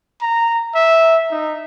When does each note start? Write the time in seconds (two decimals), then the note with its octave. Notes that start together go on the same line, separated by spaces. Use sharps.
0.22 A#5
0.75 E5
1.31 D#4